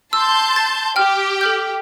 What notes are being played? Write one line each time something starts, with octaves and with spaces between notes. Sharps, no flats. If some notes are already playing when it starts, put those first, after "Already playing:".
A5 C6 E6 G6
A6
G4 G5 F6
A4 F6 G6